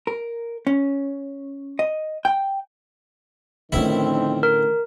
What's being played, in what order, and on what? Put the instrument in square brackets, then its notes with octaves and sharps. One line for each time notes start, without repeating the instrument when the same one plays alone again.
[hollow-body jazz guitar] A#4
C#4
D#5
G5
[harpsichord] A1 E4 [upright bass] D3 A3 [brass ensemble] D#3 F3 C4
[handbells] A#4